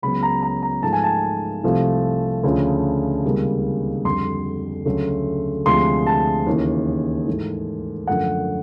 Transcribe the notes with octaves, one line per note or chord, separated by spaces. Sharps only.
C#2 C#3 F#3 B3 B5
A#5
A#5
A#5
G#2 F3 A3 A5
G#5
A5
C2 C3 F3 A3
D2 C#3 F3
C#2 C3 D#3 G3 A#3
F2 D3 G3 C6
D2 C#3 F#3 A3
D2 C3 F3 G#3 C6
A5
D#2 C#3 E3
G#2 E3 A3
F#2 D3 F3 A3 F#5